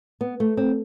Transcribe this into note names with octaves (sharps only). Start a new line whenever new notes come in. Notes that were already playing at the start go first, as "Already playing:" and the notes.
B3
A3
C4